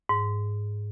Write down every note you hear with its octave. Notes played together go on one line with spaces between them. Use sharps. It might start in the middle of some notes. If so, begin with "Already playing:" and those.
G#2